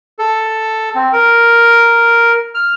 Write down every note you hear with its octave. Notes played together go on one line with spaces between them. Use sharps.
A4
C4
A#4
F6